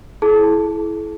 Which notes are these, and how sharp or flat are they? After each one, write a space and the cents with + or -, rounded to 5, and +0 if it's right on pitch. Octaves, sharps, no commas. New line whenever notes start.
E4 +0 G#4 +45 A5 +0